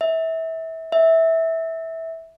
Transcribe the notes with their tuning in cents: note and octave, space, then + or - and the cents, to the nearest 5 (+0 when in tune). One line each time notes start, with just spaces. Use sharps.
E5 -25
E5 -15